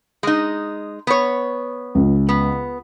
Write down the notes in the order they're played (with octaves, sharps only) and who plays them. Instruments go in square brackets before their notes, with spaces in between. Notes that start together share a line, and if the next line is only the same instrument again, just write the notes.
[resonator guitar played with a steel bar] G#3 D#4
B3 C#5
[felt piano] C#2
[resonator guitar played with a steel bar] B3